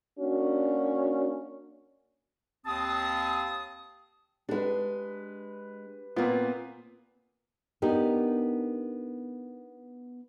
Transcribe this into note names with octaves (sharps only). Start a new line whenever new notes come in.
A#3 C#4 D4 F#4
D#2 C4 A5 D#6
G#3 D4 G4 B4
A#2 B3 C4 F4 D5
B3 D4 D#4 G4 A#4